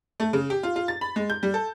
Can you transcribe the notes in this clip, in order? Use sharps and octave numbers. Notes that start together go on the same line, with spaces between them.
A3
C#3
G4
F4
F4
A6
B5
G#3
G6
G3
A4